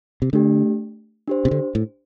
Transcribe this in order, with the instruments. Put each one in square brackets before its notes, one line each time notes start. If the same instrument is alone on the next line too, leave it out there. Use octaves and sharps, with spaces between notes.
[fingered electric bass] C3
[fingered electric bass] D3 [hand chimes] A3 D4 G4
[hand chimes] D4 G4 C5
[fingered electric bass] C3
D3
A2